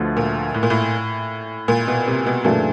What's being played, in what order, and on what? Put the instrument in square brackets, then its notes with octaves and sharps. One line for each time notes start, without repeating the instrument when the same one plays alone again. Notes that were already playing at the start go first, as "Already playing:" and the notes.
Already playing: [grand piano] D2 D3 F3 A3 [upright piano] B2
[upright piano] A#2
A2
A#2
A2
A#2
B2
C3
B2
[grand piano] F#2 C#3 E3 A3 D4 [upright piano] A#2